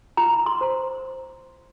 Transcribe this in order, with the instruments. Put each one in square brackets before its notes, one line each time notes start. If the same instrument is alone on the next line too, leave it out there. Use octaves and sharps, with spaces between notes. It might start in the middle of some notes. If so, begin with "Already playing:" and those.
[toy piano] F4 A#5
C6
C5